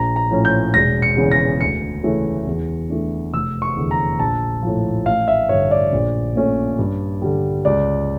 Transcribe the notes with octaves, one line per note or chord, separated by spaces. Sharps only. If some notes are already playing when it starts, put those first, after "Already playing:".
Already playing: A#1 A#5
A#5
A2 F3 C#4
G6
E1 A#6
C#7
E2 C#3
A#6
D2 C#7
C#3 E3 A3 C#4
E2
E3 A3 D4
F1 E6
C#6
E2 D3
A#5
A#1 A5
A2 F3
A1 F5
E5
G2 D3 C#5
D5
A#1
A#2 A3 C#4
G2
D3 G3
C#2 D5